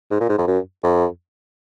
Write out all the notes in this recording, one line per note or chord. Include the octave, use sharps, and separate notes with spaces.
G#2
A#2
G#2
F2
F#2
F2